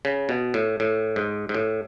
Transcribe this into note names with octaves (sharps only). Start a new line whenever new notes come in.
C#3
B2
A2
A2
G#2
G#2
A2